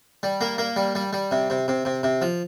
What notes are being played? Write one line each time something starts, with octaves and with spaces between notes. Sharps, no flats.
G3
A#3
A#3
G3
G3
G3
C3
C3
C3
C3
C3
F3